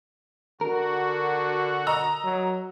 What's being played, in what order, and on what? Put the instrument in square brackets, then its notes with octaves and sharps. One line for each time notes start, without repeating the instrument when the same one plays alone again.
[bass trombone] D3 [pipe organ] F#4 [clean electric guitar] A#4
[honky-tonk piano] D#5 A#5 E6
[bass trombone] F#3